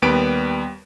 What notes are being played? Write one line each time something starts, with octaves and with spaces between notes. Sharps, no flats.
D#2 G3 B3 B4 D7